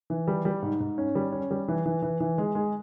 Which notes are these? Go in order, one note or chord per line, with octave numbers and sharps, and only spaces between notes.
E3
G3
G3
G#2
G#2
C#4
G3
C#4
G3
E3
E3
E3
E3
G#3
G#3